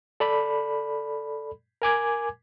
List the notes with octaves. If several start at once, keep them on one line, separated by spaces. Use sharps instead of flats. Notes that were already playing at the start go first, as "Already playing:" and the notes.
A4 D5 B5
A#4 G#5 D6 G#6